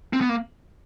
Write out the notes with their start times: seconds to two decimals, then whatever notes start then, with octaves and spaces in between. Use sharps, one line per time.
0.13 C4
0.21 B3
0.29 A#3